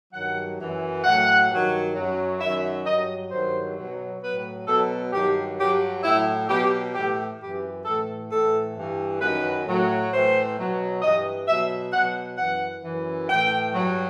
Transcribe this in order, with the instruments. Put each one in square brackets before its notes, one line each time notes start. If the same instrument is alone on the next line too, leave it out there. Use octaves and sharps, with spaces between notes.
[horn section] G2 D#3 F#3 F#5
F#2 E3
A2 F#3 F#5
G2 D#3 F#3
F#2 F#3
F#2 D#3 F#3 E5
G2 F#3 D#5
G2 D#3 F#3 C5
B2 F#3
A2 F#3 B4
B2 F#3 A4
G2 D#3 F#3 G4
G2 F#3 G4
A2 F#3 E4
B2 F#3 G4
A2 E3 G4
F#2 E3 G4
A2 E3 A4
A2 E3 A4
G2 E3
F#2 D#3 F#3 B4
A2 F#3
A2 E3 C5
B2 F#3
G2 E3 D#5
B2 F#3 E5
B2 F#3 F#5
F#2 E3 F#5
F#2 E3
A2 E3 G5
G2 F#3